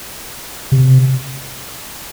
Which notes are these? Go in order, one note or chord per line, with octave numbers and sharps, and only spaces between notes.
C3